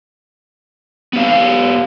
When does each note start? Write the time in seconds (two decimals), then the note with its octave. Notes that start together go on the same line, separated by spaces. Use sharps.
1.13 B3 G4 F5